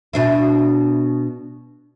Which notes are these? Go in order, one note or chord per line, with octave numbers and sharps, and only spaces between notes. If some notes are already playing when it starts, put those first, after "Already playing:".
B2 D4 E4